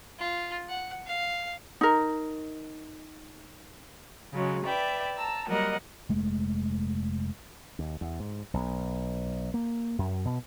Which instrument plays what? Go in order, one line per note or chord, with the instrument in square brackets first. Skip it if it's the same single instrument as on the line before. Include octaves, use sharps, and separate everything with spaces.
[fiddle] F4
F#5
F5
[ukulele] D#4 A#4
[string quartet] C#3 F#3 G#3
B4 D5 E5 G5
A5 A#5 E6
F#3 G3 A#3 A#4 D#5 F#5
[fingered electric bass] F1 G#3 A3
[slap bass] D#2
E2
G#2
B1
A#3
F#2
B2